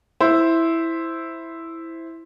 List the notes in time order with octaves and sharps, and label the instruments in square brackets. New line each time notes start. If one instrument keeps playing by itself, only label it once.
[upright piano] E4 C5